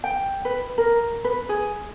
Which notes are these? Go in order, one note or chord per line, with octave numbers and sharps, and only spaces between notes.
G5
B4
A#4
B4
G#4